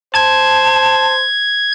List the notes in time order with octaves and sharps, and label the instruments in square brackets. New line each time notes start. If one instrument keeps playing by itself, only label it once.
[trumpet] C5 [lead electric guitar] A5 [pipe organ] G#6